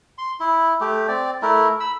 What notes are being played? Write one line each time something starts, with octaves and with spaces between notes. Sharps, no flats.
C6
E4
A3 G4
C4 D5
A3 E4 A#4
B5 E6